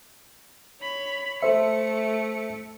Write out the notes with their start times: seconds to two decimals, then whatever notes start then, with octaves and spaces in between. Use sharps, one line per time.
0.80 C#5 B5
1.42 A3 A4 C5 E5 C#7